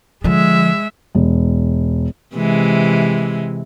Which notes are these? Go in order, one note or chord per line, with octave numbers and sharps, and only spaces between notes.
D3 F3 G#3 E5
E1
C3 E3 G#3